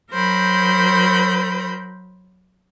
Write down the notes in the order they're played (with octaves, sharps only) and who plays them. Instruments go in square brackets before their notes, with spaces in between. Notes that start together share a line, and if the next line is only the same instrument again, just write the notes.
[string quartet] F#3 A#4 C5 B5 G6